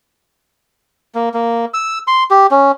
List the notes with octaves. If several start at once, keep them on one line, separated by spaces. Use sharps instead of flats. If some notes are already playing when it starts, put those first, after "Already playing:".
A#3
A#3
E6
C6
G4
C#4